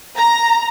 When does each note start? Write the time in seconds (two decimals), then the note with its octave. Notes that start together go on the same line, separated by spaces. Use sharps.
0.16 A#5